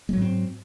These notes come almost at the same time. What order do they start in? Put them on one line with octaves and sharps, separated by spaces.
G#3 F#3 G#2 C4